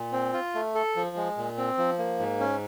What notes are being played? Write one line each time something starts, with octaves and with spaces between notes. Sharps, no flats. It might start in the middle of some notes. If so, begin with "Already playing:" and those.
Already playing: A#2
C4
F4
A3
A4
F3
G#3
A#2
C4
F3
A#3
G#2
C#4